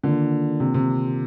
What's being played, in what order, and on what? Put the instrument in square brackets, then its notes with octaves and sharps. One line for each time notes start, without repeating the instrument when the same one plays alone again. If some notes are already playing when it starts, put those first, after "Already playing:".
[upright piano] D3 [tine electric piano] D#3 A#3 D4 F4 A#4
[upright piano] C3
C3